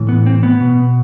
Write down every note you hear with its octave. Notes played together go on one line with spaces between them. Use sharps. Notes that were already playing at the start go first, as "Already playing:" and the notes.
Already playing: A2 E3
B3
C4
B3
B2